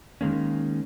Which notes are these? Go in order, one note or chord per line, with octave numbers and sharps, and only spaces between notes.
D#3 G#3 A#3 C#4